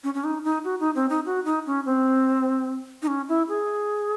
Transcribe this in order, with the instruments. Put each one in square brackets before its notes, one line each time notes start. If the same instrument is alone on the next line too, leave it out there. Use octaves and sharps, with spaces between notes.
[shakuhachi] C#4
C#4
D#4
D#4
F#4
D#4
C4
D#4
F#4
D#4
C#4
C4
D#4
C#4
E4
G#4